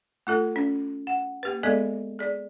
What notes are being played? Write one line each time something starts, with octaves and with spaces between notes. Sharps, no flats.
A3 F4 A4
C#4
F#5
A#3 G4 B4
G#3 B3 G#4 A4 D5 D#5
G#4 D5